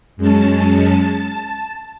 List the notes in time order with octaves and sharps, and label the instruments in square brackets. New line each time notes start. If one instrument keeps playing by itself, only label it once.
[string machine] F#2 G#3 C#4 A5
A5